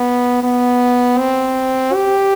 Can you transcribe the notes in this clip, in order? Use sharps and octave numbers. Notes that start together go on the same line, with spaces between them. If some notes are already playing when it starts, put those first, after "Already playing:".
Already playing: B3
B3
C4
G4